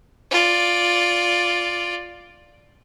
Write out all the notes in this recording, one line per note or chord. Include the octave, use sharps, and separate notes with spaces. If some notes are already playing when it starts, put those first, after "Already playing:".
F4 D5